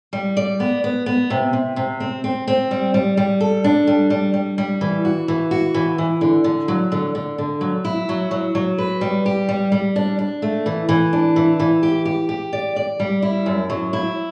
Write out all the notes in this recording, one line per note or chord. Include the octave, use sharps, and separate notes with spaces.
G3
D5
B3
B3
B3
C3
C3
C3
C4
C4
C4
G3
G3
G3
A4
D4
G3
G3
G3
G3
E3
F#4
E3
F#4
E3
E3
D3
D3
F#3
D3
D3
D3
F#3
E4
F#3
F#3
F#3
B4
G3
G4
G3
G3
D4
D4
A3
E3
E3
D4
E3
E3
G4
G4
G4
D5
D5
G3
E4
F#2
F#3
E4